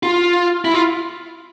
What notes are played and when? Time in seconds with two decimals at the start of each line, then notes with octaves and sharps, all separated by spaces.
0.03 F4
0.65 E4
0.74 F4